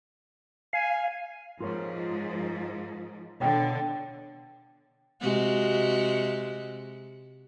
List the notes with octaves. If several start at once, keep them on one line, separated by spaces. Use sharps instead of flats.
F5 G#5
G#2 F3 F4 A#4 C#5
B2 D3 C#5 G5
C3 G#3 F#4